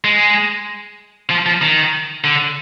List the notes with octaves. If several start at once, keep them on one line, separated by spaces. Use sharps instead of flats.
G#3
F3
F3
D#3
D3